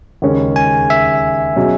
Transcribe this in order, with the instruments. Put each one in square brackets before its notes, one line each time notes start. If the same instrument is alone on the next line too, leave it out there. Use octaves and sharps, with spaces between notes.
[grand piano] D#2 C#3 G#3 C#4
[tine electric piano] G#5
E5
[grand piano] B2 F#3 C#4 G#4